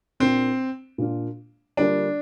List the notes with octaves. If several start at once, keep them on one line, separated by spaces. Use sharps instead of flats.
A#2 A#3 C4 D4 F4
A#2 A#3 D4 F4
D3 G3 A#3 D4 F4